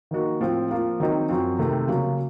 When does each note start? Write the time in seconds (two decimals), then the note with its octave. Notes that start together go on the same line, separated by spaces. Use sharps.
0.11 D#3 A#3 D#4 F#4
0.41 A2 F3 C4
0.71 F3 A#3 F4
1.00 D#3 F#3 C4 D#4
1.29 F#2 F3 C4 F#4
1.59 C3 D#3 A3 C4
1.87 C#3 F#3 A#3